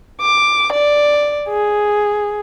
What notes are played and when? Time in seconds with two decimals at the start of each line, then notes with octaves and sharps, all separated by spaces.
0.21 D6
0.72 D5
1.49 G#4